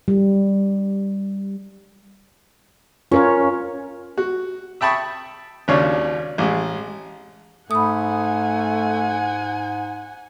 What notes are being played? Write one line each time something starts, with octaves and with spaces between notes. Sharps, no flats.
G3
C#4 F4 A#4 C#5
F#4
E5 G5 A5 B5 C#6 D#6
G#1 D#2 C#3 D4 C#5 F5
A1 G#3
G#2 A3 F#5 G#5 B5 D#6